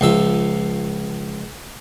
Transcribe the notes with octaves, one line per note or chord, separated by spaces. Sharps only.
C#2 F3 E5